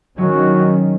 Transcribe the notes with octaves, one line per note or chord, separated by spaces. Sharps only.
D#3 F#3 G#3 C#4 D4 F#4